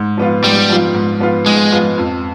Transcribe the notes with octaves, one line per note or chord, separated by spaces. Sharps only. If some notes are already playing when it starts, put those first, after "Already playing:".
Already playing: G#2
F3 B3 F4
G#2 G3
F3 B3 F4
G#2
F3 B3 F4
G#2 G#3
F3 B3 F4
F2